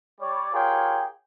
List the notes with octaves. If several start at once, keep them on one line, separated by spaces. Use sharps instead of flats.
G3 C#5 D5
F4 G4 G#4 A#4 C#5 G5